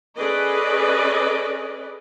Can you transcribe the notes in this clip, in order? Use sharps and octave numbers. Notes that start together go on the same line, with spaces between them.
C#4 G#4 A4 B4 D5 D#5